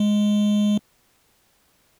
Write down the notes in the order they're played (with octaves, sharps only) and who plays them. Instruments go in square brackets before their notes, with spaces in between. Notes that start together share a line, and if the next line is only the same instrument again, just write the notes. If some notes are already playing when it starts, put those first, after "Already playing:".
Already playing: [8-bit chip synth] G#3